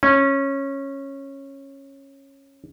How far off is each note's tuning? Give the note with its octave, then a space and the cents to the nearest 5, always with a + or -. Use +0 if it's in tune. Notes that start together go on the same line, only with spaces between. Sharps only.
C#4 -15